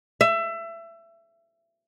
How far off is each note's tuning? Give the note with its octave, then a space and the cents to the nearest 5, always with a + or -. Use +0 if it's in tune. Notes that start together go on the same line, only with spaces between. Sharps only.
E5 +25